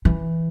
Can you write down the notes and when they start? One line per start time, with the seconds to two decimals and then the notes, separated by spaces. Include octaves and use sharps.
0.05 E3